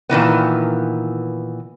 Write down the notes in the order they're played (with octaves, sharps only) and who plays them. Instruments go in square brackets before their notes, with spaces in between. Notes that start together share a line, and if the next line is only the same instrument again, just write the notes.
[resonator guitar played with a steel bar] A#2 D#3 E3 B3